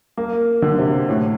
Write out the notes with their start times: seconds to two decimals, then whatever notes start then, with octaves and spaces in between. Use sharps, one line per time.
0.17 A#3
0.62 D3
0.78 C3
1.09 A2